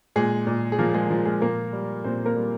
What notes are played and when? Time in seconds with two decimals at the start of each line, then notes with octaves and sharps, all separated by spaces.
0.16 A#2 G#3 G#4
0.47 A#2
0.72 G#4
0.79 F3 A#3 A#4
0.94 G#3 G#4
1.10 F3
1.25 G#3 G#4
1.42 A#2 A#3 A#4
1.73 G3
2.04 A#2 C4 C5
2.25 A#3 A#4
2.36 G3